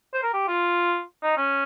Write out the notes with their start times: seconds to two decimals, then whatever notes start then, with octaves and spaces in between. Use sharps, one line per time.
0.14 C5
0.23 A#4
0.34 G4
0.48 F4
1.23 D#4
1.38 C#4